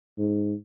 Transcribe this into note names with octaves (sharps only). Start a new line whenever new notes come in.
G#2